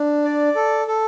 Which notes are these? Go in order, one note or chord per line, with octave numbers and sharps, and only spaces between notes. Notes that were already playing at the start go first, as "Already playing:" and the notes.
Already playing: D4
D5
A4
A4